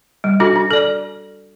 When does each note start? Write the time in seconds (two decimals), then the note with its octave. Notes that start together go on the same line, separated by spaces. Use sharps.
0.24 G3
0.40 D4 F#4 A4
0.56 D4
0.71 A4 D5